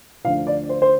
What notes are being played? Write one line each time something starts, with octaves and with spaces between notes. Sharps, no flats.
D2 D3 F3 F5
D5
C5
C5